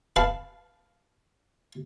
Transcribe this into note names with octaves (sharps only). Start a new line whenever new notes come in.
B4 F5 A5